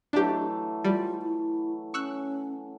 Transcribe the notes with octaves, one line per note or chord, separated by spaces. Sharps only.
E3 F#3 A3 D4 G4
G3 F4
E4
C#4 C#6 E6 F#6